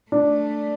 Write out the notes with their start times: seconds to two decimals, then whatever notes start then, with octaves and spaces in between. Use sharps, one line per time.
0.11 A3 D4